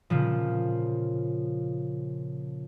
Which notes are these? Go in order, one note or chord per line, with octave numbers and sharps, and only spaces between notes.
A#2 C#3 F3